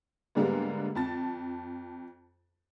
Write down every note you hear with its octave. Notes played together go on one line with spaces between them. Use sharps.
G#2 D3 G3 G#3 A#3 B3
F2 A5 A6